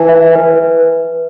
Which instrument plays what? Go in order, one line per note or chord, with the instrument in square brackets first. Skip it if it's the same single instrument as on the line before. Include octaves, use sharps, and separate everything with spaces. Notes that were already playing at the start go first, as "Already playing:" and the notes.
Already playing: [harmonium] E3 [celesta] A5
[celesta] E5
B4